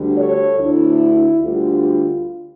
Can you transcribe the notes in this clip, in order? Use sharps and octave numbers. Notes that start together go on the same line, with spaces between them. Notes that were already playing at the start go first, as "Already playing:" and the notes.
Already playing: D2 D3 G3
A4 C#5
D2 D3 A3 D4 E4
D2 D3 G3 F4